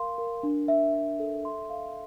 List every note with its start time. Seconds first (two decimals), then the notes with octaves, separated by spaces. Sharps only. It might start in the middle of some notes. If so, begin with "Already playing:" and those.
Already playing: A#4 F5 C6
0.18 A#4
0.43 D4
0.68 E5
0.94 E5
1.19 A4
1.45 C6
1.70 F5